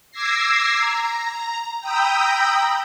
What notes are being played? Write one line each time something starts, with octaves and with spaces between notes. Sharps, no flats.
D6 E6 G#6 A#6 C7
A#5
G5 A#5 B5 D#6 E6 G6